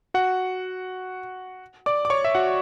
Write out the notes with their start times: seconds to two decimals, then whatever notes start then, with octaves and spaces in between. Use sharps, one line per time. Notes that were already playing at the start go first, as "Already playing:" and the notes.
0.14 F#4 F#5
1.86 D5 D6
2.05 D6
2.10 C#5 C#6
2.24 E5
2.35 F#4 F#5